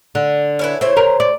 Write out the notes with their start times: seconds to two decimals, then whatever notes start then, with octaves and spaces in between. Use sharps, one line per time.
0.15 D3
0.59 C#4 E4 B4
0.81 C#3 E4 C5 C#5
0.97 A#4
1.20 D5